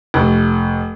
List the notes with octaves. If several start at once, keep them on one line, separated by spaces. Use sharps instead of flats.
F1